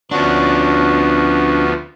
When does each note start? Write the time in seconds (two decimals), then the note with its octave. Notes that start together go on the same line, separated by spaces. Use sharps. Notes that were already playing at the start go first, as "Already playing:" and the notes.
0.11 D2 F3 B3 C#4 D4 F#4